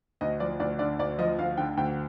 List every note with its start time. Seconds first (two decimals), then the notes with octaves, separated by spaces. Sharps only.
0.21 D2 D#5
0.40 F3 D5
0.60 D2 D5
0.79 D3 D5
0.99 D2 D5
1.19 F3 D#5
1.38 D2 F5
1.57 D3 G5
1.77 D2 G5